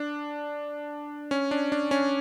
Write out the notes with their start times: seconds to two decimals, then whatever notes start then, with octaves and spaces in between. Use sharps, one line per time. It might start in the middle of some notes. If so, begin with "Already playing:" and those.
Already playing: D4
1.31 C#4
1.51 D4
1.72 D4
1.91 C#4